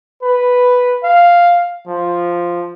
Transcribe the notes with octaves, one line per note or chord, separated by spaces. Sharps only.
B4
F5
F3